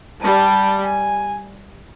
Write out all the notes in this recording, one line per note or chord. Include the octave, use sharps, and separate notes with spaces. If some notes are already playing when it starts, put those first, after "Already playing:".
G3 A5
G#5